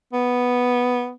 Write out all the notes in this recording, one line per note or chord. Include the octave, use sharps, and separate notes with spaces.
B3